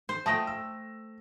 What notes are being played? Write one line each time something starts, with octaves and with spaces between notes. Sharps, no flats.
C5
A3 G5 A5 D#6 A#6
E6